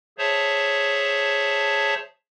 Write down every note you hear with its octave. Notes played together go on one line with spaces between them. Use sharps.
G#4 C5 C#5 E5 A5